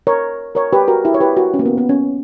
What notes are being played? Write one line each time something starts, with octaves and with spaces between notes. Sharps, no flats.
A#4 C#5
A#4 C#5
G4 B4
F#4 A#4
E4 G4
C#5
G4 B4
F#4 A#4
C#4
A#3
B3
B3
C#4